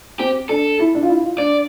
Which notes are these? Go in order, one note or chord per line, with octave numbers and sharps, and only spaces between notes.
C4 G4
D4 A4
E4
D4
F4
E4
F4
D4 D5